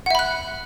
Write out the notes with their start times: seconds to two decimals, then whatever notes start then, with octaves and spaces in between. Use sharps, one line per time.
0.06 F#5
0.10 E5
0.15 B5
0.19 F#6